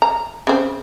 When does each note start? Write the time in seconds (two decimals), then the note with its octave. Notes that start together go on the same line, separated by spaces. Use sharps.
0.02 A#5
0.47 C#3 C4